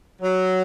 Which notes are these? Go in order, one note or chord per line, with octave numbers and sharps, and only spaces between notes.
F#3